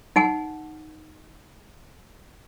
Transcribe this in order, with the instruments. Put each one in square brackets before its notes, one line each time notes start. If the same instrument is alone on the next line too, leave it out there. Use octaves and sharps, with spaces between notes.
[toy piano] D#4 F#5 G#5